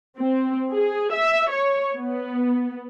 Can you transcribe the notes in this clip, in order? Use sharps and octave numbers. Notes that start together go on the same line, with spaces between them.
C4
G#4
E5
C#5
B3